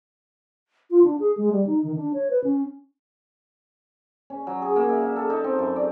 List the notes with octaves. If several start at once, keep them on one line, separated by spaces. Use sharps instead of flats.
F4
D4
G#4
G#3
G3
D#4
D#3
D4
C#5
B4
C#4
C#4
F#3
G#4
A#3
E5
E5
A4
D#4
C4
F#2
D5